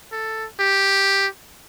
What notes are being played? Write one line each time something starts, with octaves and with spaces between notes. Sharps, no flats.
A4
G4